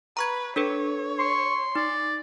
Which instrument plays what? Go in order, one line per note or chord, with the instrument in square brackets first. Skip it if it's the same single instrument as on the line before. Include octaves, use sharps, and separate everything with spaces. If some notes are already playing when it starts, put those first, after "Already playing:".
[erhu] B4 [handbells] A#5 C#6 G#6
[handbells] D4 A4 B4 [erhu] C#5
[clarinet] C6 [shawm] C#6
[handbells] D#4 [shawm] D5